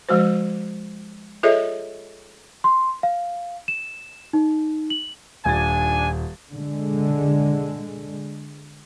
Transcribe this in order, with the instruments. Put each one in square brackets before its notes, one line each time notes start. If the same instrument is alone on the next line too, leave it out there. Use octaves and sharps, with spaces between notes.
[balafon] F3 G#3 F#4 C5
F4 G#4 A4 C#5 D#5 E5
[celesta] C6
F5
E7
D#4
F#7
[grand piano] D#1 A6 [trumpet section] D4 G#5
[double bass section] D3 G#3